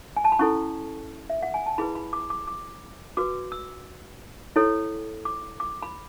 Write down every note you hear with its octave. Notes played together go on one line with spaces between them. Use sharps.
G#5
A5
B5
C#4 E4 A4 C#6
E5
F#5
G#5
A5
E4 G#4 B4 B5
B5
D6
D6
D6
F#4 B4 D6
E6
E4 A4 C#5
D6
D6
B5